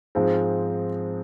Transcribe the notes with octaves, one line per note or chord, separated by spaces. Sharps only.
G#2 F3 G#3 C4